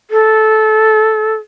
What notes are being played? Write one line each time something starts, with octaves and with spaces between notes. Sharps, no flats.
A4